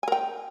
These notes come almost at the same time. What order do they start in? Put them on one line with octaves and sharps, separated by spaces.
G#5 A#4 G5